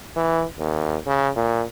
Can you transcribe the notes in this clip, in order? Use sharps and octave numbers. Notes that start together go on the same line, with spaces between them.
E3
D#2
C#3
A#2